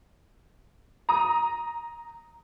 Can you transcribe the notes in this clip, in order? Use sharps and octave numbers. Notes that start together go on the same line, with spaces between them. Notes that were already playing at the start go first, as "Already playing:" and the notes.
A#5 D#6